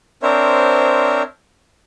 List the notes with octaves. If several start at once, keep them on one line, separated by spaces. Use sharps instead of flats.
C4 D4 A#4 C5 C#5 E5